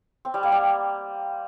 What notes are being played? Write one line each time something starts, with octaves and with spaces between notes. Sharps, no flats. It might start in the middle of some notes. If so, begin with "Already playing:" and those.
C4
G3
A#3
G3